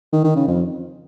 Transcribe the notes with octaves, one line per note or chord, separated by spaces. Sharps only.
D#3
D#3
C#3
F2